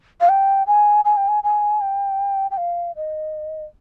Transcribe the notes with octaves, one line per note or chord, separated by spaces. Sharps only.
F5
G5
G#5
G#5
G5
G#5
G#5
G5
G5
F5
D#5